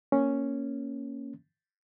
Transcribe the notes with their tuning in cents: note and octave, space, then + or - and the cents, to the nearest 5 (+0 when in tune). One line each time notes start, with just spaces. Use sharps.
A#3 +0 C#4 +0